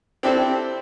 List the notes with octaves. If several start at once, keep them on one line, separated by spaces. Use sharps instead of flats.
C4 D4 E4 G4 A4 C5